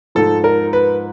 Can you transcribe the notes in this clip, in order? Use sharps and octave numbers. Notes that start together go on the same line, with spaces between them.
G#2 F3 A4
A#4
B4